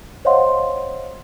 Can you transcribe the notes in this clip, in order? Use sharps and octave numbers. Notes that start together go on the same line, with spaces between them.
C5 C#5 D#5 F5 F#5 C6